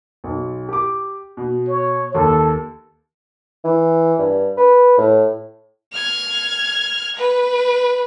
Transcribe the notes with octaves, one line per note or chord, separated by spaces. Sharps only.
B1
G4 D6
B2
C#5
D#2 A4
E3
G2
B4
A2
F6 G#6
B4